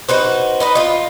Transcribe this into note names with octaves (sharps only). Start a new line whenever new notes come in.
D#4 F#4 B4 C5
D#4 B4 D#5
D#4 F4